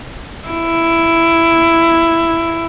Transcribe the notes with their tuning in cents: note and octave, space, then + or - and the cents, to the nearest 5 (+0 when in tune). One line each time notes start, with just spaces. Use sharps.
E4 +10